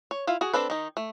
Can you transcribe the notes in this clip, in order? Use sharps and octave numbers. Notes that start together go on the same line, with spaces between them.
C#5
E4 F4 F5
F#4 G#4
C4 D4 A4 B4
D#3 D#4
A3